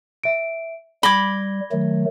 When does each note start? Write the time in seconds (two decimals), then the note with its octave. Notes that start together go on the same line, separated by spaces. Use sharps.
0.24 E5 D7
1.03 G3 B5 D6 G#6 A#6 G7
1.72 D#3 F#3 A3